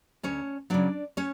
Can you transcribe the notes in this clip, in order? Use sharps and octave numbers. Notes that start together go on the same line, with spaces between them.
D2 C#4 C#5
C#3 F#3 D4 D5
C#4 C#5